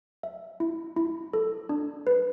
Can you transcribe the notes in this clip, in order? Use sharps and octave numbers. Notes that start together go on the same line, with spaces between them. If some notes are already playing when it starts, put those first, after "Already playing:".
E5
E4
E4
A4
D4
B4